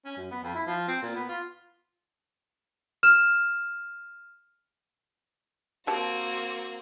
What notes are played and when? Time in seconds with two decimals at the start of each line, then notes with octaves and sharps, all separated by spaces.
0.05 C#4
0.17 F#2
0.31 B3
0.43 F2
0.55 E4
0.67 F3
0.88 C4
1.02 A#2
1.16 B3
1.29 F4
3.03 F6 E7
5.87 A#3 C4 F#4 G4 A5